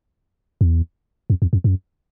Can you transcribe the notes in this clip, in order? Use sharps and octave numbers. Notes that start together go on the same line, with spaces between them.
E2
F2
E2
F2
F#2